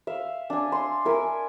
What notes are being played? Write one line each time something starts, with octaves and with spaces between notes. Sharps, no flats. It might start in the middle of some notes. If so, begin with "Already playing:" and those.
E5 F5
D4 G#5
C6
E4 A#4 G#5